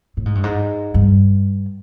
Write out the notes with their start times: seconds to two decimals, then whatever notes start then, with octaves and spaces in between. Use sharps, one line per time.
0.17 A2
0.25 G#2
0.35 G2
0.44 G#2
0.94 G2